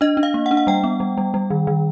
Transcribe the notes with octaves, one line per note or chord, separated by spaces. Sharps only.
D4 D#5
D4
F5
A#3
F#5
D4
F#5
G3 G5
B3
G3
G3
G3
D#3
D#3